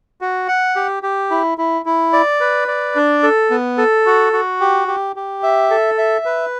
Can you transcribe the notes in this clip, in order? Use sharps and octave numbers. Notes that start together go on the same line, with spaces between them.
F#4
F#5
G4
G4
E4
E4
E4
D5
B4
D5
D4
A4
B3
A4
F#4
F#4
G4
G4
G4
E5
A4
E5
B4